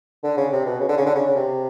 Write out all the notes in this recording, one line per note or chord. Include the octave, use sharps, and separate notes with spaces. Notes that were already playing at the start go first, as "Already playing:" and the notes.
D3
C#3
C3
B2
C#3
D3
C#3
D3
C#3
C#3
C3